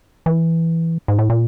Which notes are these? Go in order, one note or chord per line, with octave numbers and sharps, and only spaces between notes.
E3
G#2
A2
A#2